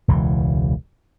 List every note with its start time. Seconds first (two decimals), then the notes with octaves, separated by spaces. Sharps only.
0.08 E1 C#2 E3